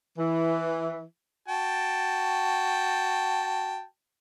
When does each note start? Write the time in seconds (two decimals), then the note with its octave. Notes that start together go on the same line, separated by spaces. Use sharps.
0.18 E3
1.48 F#4 G5 A5